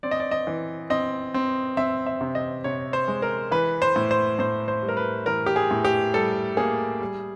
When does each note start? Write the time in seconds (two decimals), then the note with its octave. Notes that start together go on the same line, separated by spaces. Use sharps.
0.03 C4 D5
0.11 D#5
0.20 D5
0.31 D#5
0.47 E3
0.90 C4 D#5
1.34 C4
1.77 C4 E5
2.06 E5
2.21 C3
2.35 D#5
2.64 C3 C#5
2.93 C5
3.08 G#3
3.22 A#4
3.51 E3 B4
3.82 C5
3.96 A2
4.11 C5
4.39 A2 C5
4.68 C5
4.82 G3
4.89 A#4
4.97 B4
5.26 E3 A#4
5.46 G4
5.56 G#4
5.71 A2
5.85 G4
6.14 G3 A4
6.57 A#3 G#4
7.00 G3